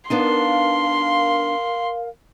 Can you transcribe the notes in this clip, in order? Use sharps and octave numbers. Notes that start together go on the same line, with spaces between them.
B3 D4 D#4 A#4 F5 C6